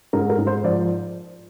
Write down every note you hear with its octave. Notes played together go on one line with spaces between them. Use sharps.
G#2 A#4
A#4
G#2
C5
F3 D5